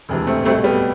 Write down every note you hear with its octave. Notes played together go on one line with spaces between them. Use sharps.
E1 D2 C3 E3
A3 C4
C2 B2 A3 C4
G3 B3